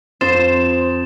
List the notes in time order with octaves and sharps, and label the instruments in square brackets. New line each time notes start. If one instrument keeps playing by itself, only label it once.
[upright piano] F2 [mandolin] C5 [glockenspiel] A6 E7